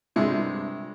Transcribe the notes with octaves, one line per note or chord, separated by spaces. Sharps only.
G2 C3 G#3 D4